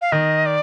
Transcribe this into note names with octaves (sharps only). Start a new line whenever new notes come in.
F5
D#3 D#5
D5